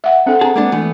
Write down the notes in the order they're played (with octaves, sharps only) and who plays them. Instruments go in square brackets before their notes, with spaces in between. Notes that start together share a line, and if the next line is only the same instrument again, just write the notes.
[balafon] E5 F#5
[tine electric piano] C4 F#5 [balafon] D4 A4
[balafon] D4 A#5 [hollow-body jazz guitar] G#4 A5
[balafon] G#3 [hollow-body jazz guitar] A#3 B3 D4
[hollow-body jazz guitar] E3 A3 B3